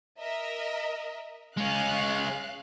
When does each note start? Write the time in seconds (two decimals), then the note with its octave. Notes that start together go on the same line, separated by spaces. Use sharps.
0.18 A#4 D#5 E5
1.57 G#3 C#4 F5 F#6